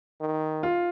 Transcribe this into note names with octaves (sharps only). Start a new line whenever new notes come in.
D#3
F4